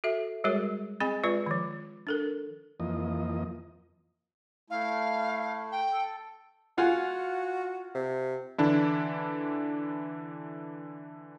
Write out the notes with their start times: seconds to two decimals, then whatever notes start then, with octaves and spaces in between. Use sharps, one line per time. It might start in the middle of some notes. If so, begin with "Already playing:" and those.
0.04 F#4 A4 E5
0.44 G3 G#3 F#4 G#4 A#4 C#5
1.00 C4 G#4 D#5 G#5 B5
1.24 G#3 F4 B4 D5
1.46 D#3 F3
2.07 D4 A4 A#4
2.80 F2 E3 F3 A#3 D#5
4.70 A3 E4 F5
5.72 G5
5.92 A4
6.78 F4 F#4 F#5 G#5
7.95 C3
8.58 D3 E3 D4 E4